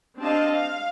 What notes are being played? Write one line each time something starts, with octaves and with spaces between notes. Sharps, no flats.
C4 D4 G4 D#5 F5 A5
F5